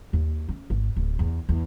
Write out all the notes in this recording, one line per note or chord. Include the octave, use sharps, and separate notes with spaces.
D#2
C#4
G#1
D1
E2
E2